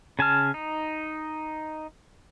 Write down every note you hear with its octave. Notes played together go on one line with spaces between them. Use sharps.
C#3 G#5 A5 F6
D#4